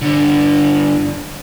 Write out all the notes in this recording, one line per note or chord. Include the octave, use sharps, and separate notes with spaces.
G2 D3